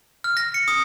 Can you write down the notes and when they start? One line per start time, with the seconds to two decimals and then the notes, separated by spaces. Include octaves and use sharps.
0.24 F6
0.37 A#6
0.54 C#7
0.68 D#6